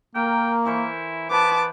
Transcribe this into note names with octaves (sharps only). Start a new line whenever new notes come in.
A#3 A#4 G5
E3 E4 C5 C#6
B3 B4 C5 A5 D6